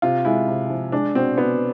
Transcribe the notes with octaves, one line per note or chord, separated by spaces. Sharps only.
C3 F4
G#3 E4
C3
F3
G#3 D4
B2 C4
B2 B3